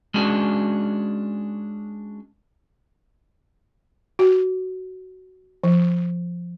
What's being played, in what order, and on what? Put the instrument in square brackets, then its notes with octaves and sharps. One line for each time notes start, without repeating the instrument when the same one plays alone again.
[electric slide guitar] G#3 C#4 D4 F#4
[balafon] F#4
F3